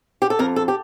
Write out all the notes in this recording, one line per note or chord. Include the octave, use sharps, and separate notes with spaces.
G4
A4
F2 A#4
A4
G4